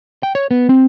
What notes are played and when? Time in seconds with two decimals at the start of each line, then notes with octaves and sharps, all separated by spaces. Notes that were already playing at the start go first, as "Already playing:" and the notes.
0.23 G5
0.35 C#5
0.51 B3
0.69 C4